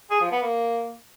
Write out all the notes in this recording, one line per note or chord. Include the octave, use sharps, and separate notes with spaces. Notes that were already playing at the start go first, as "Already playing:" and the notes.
G#4
F3
B3
A#3